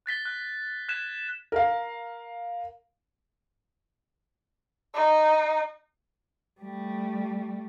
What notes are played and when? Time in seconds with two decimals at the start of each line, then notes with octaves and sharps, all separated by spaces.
0.06 F#6 A6 B6 G7
0.25 F#6
0.88 F#6 G#6 B6 E7
1.52 A#4 F5
4.95 D#4
6.61 G3 A3